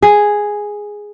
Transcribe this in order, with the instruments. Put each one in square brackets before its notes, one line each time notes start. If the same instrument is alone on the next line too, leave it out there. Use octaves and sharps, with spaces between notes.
[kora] G#4